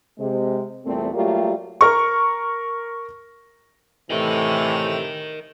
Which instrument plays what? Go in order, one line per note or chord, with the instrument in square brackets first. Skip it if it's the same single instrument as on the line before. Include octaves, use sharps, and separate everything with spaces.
[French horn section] C3 G#3
E2 A#2 G3 A3 C4
F#3 G3 A3 A#3 F4 G4
[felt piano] A#4 C#6
[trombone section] A2 E3 [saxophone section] C3 A3 [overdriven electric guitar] A#4 D#5